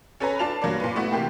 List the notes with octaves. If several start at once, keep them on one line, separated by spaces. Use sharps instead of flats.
C#4 A4 B4 G#5 A#5
D4 F4 A5 F7
G2 F#3 A#3 D4
A#2 B4
A3 B3 E4 F#4
C3 E3 A#3 G4